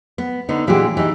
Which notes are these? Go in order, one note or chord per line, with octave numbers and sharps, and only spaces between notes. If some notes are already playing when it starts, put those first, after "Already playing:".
B3
D3 B3 D#4
A#2 E3 G#3 D4 F#4 G4
E3 D#4